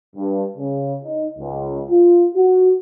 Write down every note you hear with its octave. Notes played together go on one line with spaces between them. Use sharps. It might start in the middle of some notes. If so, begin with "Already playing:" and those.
G2
C#3
D#4
C#2
F4
F#4